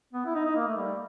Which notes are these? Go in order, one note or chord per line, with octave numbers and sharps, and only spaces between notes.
B3
E4
D#4
D#4
A#3
A3
G3